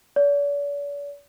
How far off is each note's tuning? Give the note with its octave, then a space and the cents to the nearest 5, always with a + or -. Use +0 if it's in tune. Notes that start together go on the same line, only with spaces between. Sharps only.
D5 -45